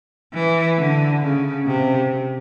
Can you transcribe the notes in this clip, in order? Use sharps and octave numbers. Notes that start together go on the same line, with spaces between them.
E3
D3
C#3
C3